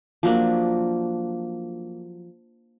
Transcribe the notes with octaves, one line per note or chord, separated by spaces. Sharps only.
F3 F#3 A#3 D4